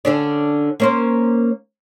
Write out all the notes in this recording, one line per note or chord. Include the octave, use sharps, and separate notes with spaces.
D3 C#4 D4
A#3 C#4 C5